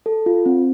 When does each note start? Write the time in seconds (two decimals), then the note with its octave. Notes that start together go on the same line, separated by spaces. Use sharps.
0.06 A4
0.26 F4
0.46 C4